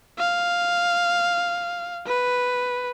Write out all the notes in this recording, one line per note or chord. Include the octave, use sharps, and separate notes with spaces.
F5
B4